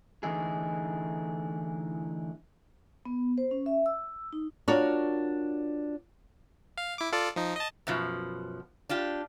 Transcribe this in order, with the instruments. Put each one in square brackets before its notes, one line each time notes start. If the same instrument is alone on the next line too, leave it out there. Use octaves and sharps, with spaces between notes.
[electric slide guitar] D3 E3 A3 D#4 E4 G#4
[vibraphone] B3
C5
C#4
E5
E6
D#4
[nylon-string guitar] D4 F4 F#4 A#4 C#5 D5
[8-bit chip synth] F5
E4 D6
F4 A4 D5
F3 D#4
D#5 A5
[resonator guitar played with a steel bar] F#2 B2 F3
D4 F4 G4